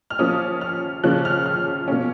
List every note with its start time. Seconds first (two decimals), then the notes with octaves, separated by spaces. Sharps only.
0.10 F6
0.19 F3 A#3 C#4 D#6
0.61 F6
1.04 C#3 F3 A#3 C#4 F#6
1.25 F6
1.46 F6
1.88 B2 A#3 C#4